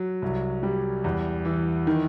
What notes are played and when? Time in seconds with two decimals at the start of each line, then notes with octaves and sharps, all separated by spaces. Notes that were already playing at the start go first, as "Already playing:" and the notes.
Already playing: F#3
0.22 C2
0.63 G3
1.04 E2
1.45 E3
1.87 D#3